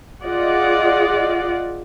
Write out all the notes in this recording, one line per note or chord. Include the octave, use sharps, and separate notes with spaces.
F4 G#4 D5 D#5 F#5